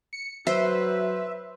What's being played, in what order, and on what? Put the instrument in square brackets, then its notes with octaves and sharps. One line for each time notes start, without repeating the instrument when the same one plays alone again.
[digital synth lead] C#7
[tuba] F#3 [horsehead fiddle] B4 [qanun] C5 [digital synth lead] E5